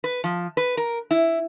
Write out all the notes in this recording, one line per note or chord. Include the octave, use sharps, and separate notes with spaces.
B4
F3
B4
A#4
E4